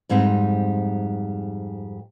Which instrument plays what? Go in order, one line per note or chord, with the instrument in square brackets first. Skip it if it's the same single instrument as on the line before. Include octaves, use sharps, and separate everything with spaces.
[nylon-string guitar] F2 G#2 G3 C4 D#4